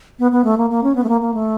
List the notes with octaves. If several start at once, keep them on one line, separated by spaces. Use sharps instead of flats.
B3
B3
A3
A#3
A#3
C#4
B3
A3
A#3
A#3
A3